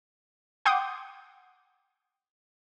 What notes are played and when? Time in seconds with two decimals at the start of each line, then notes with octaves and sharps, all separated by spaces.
0.65 F#5 G5 C6 D6 D#6 G6